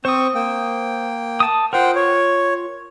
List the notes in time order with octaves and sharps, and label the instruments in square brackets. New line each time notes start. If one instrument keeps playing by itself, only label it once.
[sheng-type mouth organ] C4 C#6 [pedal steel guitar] C5 D#6
[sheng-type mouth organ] A#3 G5
[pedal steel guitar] A5 D#6
[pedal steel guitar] F4 A#4 [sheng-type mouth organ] C5 F#5 G5
[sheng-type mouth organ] C#5